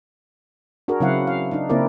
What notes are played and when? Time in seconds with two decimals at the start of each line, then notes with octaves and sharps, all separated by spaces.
0.88 D4 F#4 G#4 A#4
1.00 C#3 F#3 C4 E4 F5 F#5
1.27 F5
1.51 D4 D#4
1.69 C#3 A#3 C4 E4 A#4 D5